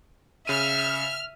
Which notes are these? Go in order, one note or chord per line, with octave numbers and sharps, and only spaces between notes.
C#3 E5 F6 D#7